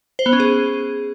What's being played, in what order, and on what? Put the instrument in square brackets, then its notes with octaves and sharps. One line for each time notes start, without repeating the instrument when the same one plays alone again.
[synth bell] C5
B3
C#4
G#4